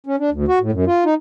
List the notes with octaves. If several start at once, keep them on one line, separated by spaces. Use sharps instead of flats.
C#4
D4
D2
F#4
A2
F#2
F4
D#4